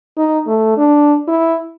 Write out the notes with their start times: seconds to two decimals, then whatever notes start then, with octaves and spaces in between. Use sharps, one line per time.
0.17 D#4
0.47 A3
0.77 D4
1.28 E4